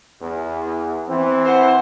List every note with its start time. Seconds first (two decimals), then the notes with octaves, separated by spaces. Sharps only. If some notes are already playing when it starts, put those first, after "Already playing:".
0.21 E2
1.08 E3 C4
1.45 C5 F#5